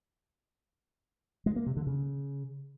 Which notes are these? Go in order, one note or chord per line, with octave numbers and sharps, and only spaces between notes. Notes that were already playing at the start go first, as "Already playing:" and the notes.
G#3
A#3
C3
D3
C#3